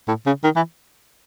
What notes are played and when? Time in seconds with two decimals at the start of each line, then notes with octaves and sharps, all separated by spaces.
0.08 A2
0.26 C#3
0.44 D#3
0.56 E3